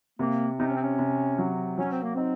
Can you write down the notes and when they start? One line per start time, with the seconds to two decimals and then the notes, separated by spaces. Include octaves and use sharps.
0.19 C3 A#3
0.59 C3 D#4
0.67 C#4
0.74 C4
0.82 C#4
0.99 C3
1.38 F#3
1.78 F#3 C#4
1.91 C4
2.03 A#3
2.15 C4 D#4